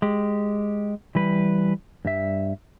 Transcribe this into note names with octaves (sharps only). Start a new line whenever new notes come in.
G#3 G4
E3 G3 B4
G2 G3 E5